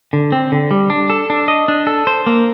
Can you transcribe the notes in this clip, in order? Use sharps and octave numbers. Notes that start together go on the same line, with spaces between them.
D3
C4
D3
G3
D4
A4
D4
D#5
D4
A4
C5
A#3